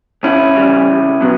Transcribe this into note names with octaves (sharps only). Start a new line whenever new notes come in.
C#2 C#4 E4
C#3 E3 G3
C#2
B2 F#3 B3